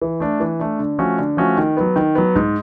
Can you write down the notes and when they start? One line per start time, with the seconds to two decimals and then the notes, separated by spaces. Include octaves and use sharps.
0.02 E3
0.20 A3 D4
0.40 E3
0.60 A3 D4
0.79 D3
0.98 F3 A3 C#4 F#4
1.18 D3
1.37 F3 A3 C#4 F#4
1.57 D#3
1.77 F#3 B3
1.96 D#3
2.15 F#3 B3
2.36 G#2